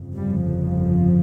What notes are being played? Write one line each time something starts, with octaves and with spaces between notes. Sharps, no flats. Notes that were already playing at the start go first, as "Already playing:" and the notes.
Already playing: G1 F2 C#3
G3
F3